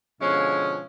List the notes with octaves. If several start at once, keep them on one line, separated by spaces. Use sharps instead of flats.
B2 D3 F3 G#3 C#4